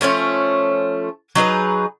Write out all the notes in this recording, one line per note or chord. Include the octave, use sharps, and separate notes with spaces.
F3 A3 C#4 C#5
F#3 D#4 G#4 B4